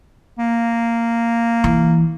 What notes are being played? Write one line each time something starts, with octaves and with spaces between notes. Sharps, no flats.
A#3
E3